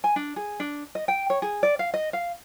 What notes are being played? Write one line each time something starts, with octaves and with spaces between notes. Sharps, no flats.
G#5
D4
G#4
D4
D#5
G5
C#5
G#4
D5
F5
D#5
F5